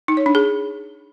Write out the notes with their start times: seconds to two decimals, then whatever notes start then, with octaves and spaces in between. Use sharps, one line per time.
0.08 D#4
0.17 C#5
0.26 D4
0.35 G#4